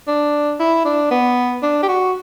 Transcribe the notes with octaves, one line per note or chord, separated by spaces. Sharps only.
D4
E4
D4
B3
D4
G4
F#4